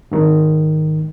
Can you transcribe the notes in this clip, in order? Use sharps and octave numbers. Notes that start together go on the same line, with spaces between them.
G#2 D#3